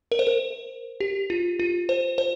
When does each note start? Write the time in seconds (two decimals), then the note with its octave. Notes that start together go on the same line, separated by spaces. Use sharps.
0.12 A#4
0.19 C5
0.27 A#4
1.00 G4
1.30 F4
1.59 F4
1.89 C5
2.18 C5